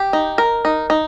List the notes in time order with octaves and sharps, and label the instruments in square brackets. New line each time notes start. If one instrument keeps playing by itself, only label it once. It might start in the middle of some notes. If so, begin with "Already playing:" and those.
Already playing: [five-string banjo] G4
D#4
A#4
D#4
D#4